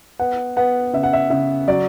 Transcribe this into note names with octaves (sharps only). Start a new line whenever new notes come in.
B3 F#5
B3 F#5
C#3 E5
F#5
E5
C#3 E5
F#3 D5